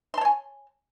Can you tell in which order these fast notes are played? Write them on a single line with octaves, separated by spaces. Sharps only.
C6 A5 C#5 G#5